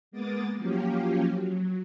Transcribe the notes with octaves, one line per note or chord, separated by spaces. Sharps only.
G#3 A#3 B3 D6 D#6 A6
F3 F#3 A#3 C#4 F4 G4
F#3